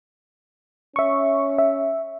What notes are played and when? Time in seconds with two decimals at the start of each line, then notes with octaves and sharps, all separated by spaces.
0.96 C#4 E5 C#6
1.58 E5